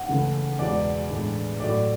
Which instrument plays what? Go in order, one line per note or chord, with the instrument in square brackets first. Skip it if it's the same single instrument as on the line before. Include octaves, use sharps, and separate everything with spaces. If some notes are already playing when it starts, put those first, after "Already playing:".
Already playing: [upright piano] F#5
C#2 C#3 E3 A3
E2 B2 G#3 D5
A2 E3 G#3 D4
A2 F#3 A3 D5